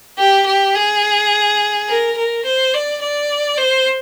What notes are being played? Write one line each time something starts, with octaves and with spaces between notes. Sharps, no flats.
G4
G4
G#4
A#4
A#4
C5
D5
D5
C5